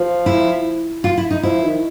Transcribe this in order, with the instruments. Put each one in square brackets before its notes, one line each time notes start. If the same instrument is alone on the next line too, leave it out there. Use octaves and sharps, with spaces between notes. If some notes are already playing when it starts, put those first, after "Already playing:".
Already playing: [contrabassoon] F3
[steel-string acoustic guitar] E4
F4
E4
D#4
[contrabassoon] F3 [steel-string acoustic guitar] E4
[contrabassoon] D#3